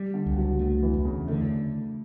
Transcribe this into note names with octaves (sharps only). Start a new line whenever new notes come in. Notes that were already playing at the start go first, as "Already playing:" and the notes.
Already playing: G3
D3
C#2
F#3
F#3 A3
E3
E2
C#3
D3 A3